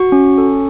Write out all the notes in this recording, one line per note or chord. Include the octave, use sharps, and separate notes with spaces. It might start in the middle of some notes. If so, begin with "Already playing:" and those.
Already playing: F#4 C#6
C#4
A4